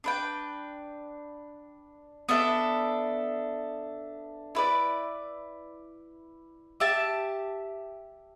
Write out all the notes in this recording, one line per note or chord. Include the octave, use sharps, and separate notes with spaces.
D4 B4 G5
B3 D4 A4 E5
E4 B4 D5
G4 E5 A5